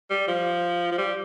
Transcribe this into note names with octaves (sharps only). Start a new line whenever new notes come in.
G3
F3
F3
G3